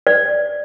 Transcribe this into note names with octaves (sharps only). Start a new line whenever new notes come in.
D5